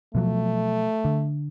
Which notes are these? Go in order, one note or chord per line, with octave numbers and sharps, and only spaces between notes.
B2 F3 F#3 A3
D3